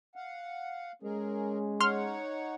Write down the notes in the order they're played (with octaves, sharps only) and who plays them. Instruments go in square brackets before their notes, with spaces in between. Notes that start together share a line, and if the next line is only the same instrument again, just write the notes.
[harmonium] F5 F#5
[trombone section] G#3 C#4 [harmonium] G#4 A#4
[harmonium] D#4 C#5 F#5 [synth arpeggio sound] C6 F6